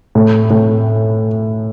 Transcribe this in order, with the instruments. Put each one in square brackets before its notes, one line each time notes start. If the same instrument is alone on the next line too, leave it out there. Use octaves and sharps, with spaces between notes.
[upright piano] A2
A2